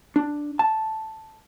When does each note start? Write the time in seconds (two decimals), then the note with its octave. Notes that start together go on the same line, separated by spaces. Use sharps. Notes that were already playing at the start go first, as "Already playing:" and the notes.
0.16 D4
0.59 A5